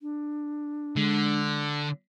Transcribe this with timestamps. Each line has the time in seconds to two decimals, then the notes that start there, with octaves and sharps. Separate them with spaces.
0.01 D4
0.97 D3 G#3